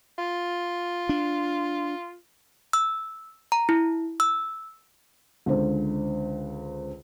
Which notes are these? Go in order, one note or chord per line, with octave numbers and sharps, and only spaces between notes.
F4
D4
E6
A#5
E4
E6
C#2 D3 C5